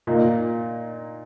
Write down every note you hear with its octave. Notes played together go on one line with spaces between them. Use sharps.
A#2 A#3 D#4